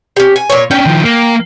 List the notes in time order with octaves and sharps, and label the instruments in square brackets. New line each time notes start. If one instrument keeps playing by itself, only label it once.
[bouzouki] C#4 G4
G#5
A#2 C#5
[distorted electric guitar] C#4 D4 [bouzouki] G5
[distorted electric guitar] D#3 F3
A#3